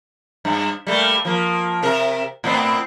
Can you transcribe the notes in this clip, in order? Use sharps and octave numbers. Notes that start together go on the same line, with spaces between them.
G2
G3 A3 A#3
F3 A#3
C3 A#4
A2 B3 C4